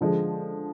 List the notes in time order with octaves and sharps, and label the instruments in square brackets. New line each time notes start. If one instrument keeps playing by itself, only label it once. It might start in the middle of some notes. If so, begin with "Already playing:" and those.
[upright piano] D3 F3 G#3